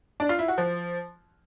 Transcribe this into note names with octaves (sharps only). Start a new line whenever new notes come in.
D4
F4
E4
F#4
F3